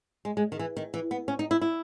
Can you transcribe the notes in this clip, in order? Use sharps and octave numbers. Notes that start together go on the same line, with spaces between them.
G#3
G#3
D#3
E3
D#3
E3
B3
C#4
D#4
E4
E4